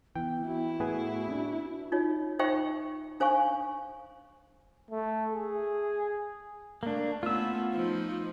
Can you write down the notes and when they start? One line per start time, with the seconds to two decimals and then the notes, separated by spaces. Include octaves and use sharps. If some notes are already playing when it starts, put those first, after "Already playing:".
0.16 E3 B3 G5
0.47 E4 F#4
0.80 A2 B3 G#4 B4
1.28 C4 D4
1.92 D#4 F4 C#5
2.39 D#4 C5 E5 G5 B5 C#6
3.20 D4 C5 F5 G#5 C#6
4.90 A3
5.33 G#4
6.83 A3 A#3 D4
7.23 A3 B3 C#4 F4 E6
7.73 F3 D#4